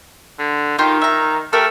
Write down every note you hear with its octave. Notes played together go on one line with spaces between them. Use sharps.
D3
D#3 D#4 F4 G4
E5 A#5
A3 G4 A#4